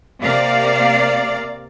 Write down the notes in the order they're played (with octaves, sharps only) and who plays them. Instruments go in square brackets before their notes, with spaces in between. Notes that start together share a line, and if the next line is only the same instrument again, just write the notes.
[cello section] C3 A#3 D5 F5